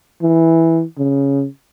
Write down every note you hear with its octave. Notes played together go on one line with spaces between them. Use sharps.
E3
C#3